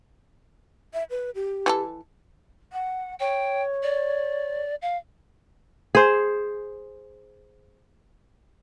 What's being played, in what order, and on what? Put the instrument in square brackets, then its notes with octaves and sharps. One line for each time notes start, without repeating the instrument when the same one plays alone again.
[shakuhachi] E5
B4
G4
[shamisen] E3 G#4 A4
[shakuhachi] F#5
[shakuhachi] C#5 [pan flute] G5
[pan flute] D5
F5
[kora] G#4 C5